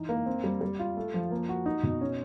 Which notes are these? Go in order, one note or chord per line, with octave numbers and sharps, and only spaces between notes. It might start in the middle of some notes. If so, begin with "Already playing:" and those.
Already playing: E3 D#4
A#3
C4
G3
G3
F4
A3
F3
A#3
F#4
D#4
B2
C#4